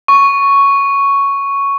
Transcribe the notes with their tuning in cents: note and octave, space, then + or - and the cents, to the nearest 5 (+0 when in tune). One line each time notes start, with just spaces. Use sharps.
C#6 +5